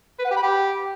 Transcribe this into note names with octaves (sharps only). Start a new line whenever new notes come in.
B4
F#5
G4
B5
G4